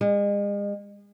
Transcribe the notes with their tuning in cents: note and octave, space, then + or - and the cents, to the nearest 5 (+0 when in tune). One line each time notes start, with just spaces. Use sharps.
G#3 -40